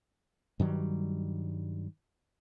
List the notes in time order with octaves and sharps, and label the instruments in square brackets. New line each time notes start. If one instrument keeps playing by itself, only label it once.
[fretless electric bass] G2 D#3 F#3 G3